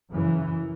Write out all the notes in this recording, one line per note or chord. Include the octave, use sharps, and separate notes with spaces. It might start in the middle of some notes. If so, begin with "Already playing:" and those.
F#2 C#3 E3